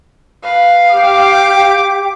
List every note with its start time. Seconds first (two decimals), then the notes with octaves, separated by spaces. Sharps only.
0.44 B4 F5
0.91 G4 D6